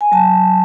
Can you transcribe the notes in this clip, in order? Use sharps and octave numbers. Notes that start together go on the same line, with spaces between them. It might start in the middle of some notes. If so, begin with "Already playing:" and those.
G#5
F#3 A5
F#3